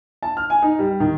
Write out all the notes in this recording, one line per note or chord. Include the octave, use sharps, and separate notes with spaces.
A5
F6
G#5
D#4
G3
D#3